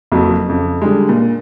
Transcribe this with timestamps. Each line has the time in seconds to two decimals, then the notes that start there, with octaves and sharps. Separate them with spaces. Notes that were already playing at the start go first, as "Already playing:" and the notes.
0.12 F#1 F2 F#3
0.48 F2 C#3
0.82 D3 G3 G#3
1.09 A#2